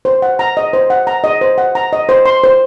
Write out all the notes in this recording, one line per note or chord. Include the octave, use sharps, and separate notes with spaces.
C5
F#5
A#5
D#5
C5
F#5
A#5
D#5
C5
F#5
A#5
D#5
C5
C6
C5